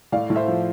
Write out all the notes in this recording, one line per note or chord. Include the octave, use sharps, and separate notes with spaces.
A2 D5 F5
A2
C5 E5
F3